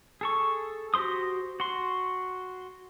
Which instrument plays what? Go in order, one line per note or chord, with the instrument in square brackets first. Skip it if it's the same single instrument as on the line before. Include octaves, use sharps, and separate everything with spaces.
[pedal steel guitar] G#4 A4 C#6
F#4 G4 C5 C6 D#6
F#4 C6